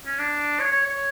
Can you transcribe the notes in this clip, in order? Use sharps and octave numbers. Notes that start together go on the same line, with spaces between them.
C#4
D4
C#5
C#5
C#5